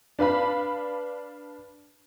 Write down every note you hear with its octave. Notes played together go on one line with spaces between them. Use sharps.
D4 B4 F5 B5